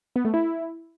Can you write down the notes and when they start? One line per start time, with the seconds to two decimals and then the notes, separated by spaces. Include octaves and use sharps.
0.16 B3
0.25 A3
0.34 E4